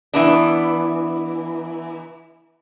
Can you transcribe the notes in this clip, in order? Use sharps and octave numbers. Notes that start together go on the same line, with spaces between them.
E3 B3 D4